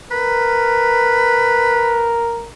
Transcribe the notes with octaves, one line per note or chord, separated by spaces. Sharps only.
A#4 B4